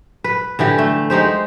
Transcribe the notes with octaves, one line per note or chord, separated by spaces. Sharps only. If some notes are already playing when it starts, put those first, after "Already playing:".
B4
D3 E3 G4
A3
G#3 D#4 G4 C5